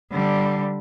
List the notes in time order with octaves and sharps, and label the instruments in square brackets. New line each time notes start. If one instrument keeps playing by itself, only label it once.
[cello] D3 G3